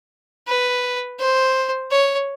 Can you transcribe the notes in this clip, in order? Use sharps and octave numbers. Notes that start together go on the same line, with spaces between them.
B4
C5
C#5